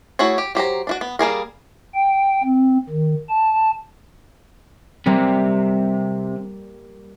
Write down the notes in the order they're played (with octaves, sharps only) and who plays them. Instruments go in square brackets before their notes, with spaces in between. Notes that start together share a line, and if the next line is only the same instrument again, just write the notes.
[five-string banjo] A3 E4 F#4 G#4 C#5
G4
F#3 G4 C5 A#5
D4 E4 F#4
B3
G3 A#3 G#4 A#4
[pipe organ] G5
C4
D#3
A5
[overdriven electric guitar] C3 [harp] G3 A#3